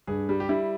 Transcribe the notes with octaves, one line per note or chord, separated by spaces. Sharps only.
G2 G#4
G3
G4
G3 E4